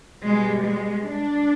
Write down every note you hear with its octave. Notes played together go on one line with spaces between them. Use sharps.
B2 G3 G#3
G#3
D4